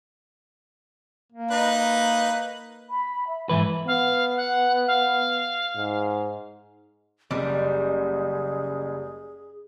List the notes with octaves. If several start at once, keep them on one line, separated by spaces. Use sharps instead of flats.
A#3
D#4 B4
B5
E5
G#2 E3 B4 E5
B3 F5
F#5
F5
G#2
F#1 G3 B3 G#4